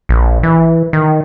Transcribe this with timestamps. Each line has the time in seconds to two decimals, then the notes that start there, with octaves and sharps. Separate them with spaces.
0.09 A#1
0.43 E3
0.93 D#3